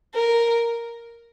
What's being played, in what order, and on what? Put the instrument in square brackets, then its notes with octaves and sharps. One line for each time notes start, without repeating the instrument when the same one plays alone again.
[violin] A#4